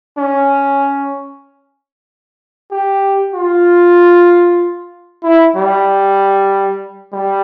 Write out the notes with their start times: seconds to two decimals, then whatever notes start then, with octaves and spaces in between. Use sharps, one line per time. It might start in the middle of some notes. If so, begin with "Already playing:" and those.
0.18 C#4
2.71 G4
3.34 F4
5.23 E4
5.56 G3
7.13 G3